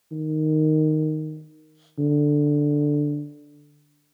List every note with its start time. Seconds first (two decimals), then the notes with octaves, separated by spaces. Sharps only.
0.12 D#3
1.98 D3